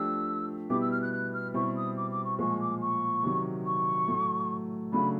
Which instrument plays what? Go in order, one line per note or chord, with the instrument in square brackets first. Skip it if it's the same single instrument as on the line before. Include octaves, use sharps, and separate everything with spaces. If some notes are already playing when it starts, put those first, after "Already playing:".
Already playing: [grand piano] F3 A3 D4 G4 [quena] E6
[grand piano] B2 G3 B3 E4 G4 [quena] D6
[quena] E6
F6
F#6
F#6
F6
[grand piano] B2 G3 C4 E4 G4 [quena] C#6
[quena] D#6
D6
D6
C#6
[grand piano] A#2 F3 G#3 [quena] C#6
[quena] D6
C#6
[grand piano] C3 D#3 F#3
[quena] C#6
[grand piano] A2 F#3 A3
[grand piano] C#3 F#3 A3 D4 [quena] B5